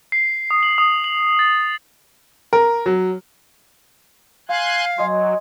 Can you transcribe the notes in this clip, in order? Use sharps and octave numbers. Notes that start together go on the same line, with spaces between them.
C7
D#6
F#7
D#6
F#7
A6
A#4
F#3
F5 G#5 C6 F#6 G#6
F#3 D#5 G#5 C6